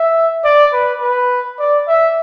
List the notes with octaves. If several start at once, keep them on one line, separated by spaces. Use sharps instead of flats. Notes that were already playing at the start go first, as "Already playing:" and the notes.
Already playing: E5
D5
B4
B4
D5
E5